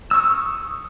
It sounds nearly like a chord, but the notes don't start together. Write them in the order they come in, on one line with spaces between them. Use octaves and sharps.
E6 C#6 D#6